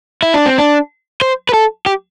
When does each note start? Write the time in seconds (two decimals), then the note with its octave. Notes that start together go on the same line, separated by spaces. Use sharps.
0.23 E4
0.34 D4
0.46 C4
0.58 D4
1.21 C5
1.49 B4
1.53 A4
1.86 G4